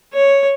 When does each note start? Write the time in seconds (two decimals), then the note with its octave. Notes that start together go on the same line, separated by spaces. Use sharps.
0.13 C#5